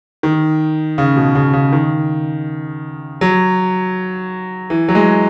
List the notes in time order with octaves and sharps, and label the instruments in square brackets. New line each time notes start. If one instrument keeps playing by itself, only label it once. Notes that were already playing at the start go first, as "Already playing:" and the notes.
[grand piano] D#3
C#3
B2
C#3
C#3
D#3
F#3
E3
F#3
G#3